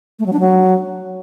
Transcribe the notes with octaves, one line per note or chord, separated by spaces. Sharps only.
A3
F#3
D4
F#3